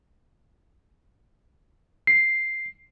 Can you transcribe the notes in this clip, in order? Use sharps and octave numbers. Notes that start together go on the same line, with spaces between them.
C7